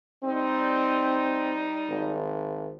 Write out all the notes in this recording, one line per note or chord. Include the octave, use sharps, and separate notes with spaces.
G3 C4 D#4
G#1